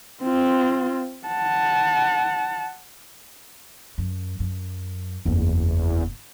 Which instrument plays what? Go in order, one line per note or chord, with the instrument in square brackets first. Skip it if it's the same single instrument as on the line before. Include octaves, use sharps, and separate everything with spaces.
[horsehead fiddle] C4 F4
F#5 A5
[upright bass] F#2
F#2
[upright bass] F#1 E4 [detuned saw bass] E2